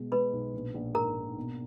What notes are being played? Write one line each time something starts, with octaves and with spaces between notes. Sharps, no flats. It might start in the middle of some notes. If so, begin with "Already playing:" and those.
Already playing: B2 G#3
G#3 B4 B5
B1
A#1
A#1
G#2 A#4 A#5
A#3
B2